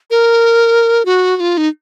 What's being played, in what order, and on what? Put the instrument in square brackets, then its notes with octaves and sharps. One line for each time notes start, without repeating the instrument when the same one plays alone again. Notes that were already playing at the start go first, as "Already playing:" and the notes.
[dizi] A#4
F#4
F#4
F4
D#4